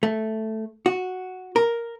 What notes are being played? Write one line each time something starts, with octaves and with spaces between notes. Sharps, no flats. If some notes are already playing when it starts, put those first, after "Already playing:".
A3
F#4
A#4